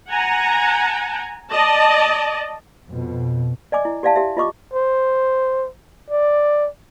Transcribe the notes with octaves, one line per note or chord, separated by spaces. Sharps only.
F#5 G#5 A#5
D5 D#5 A5
F2 B2
D5 D#5 G#5 D6
E4
G4 D5 E5 F5 A5
G4 E5
F4 D#5 C#6 D6
C5
D5